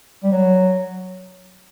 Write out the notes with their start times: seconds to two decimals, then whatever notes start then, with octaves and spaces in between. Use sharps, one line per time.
0.23 G3
0.32 F#3